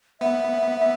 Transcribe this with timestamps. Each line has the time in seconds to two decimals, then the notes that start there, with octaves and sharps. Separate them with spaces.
0.20 B3 E5
0.78 E5